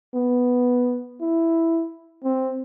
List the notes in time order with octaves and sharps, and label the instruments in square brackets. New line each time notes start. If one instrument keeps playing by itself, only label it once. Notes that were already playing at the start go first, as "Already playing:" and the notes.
[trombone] B3
E4
C4